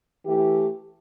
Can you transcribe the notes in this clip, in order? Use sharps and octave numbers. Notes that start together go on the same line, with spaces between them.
E3 A3 E4 G4